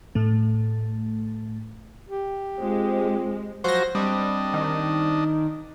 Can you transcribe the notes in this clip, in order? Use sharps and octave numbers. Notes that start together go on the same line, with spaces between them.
A2 A3
G4
G#3 C4 F4 C5
F3 F#3 F#4 C5 A#6
G3 C4 D4 D#5
D#3